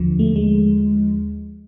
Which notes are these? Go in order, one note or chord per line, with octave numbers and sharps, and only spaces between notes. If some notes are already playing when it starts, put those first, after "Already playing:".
Already playing: D#2 D3 F3
A3
G#3